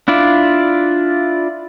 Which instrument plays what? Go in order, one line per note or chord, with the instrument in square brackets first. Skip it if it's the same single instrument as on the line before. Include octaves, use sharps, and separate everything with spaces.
[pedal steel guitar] D4 E4 F4 D5